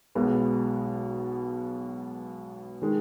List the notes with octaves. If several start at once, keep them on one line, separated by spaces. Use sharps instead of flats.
B1 B2 G#3 B3
D#3 G#3